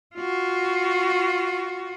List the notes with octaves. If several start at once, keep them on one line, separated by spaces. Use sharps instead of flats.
F4 F#4